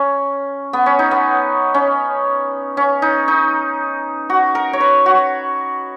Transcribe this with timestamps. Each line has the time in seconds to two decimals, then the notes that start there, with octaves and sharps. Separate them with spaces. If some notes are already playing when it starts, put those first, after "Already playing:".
Already playing: C#4
0.73 B3
0.86 C#4
0.99 D#4
1.11 B3
1.74 C#4
2.77 C#4
3.02 D#4
3.28 D#4
4.30 F#4
4.55 A#4
4.73 C#5
4.80 B4
5.06 F#4